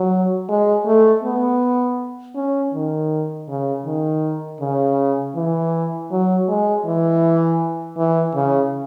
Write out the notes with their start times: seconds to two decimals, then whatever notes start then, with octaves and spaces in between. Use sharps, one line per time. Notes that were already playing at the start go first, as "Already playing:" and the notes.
Already playing: F#3
0.49 G#3
0.86 A3
1.23 B3
2.36 C#4
2.74 D#3
3.49 C#3
3.85 D#3
4.61 C#3
5.36 E3
6.11 F#3
6.48 G#3
6.86 E3
7.97 E3
8.35 C#3